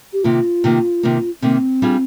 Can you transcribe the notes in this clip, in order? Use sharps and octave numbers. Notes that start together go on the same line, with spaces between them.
G4
C3 D#3 A#3 F4
C3 D#3 A#3
C3 D#3 A#3
C3 D#3 A#3 C4
G3 D4 F4 G#4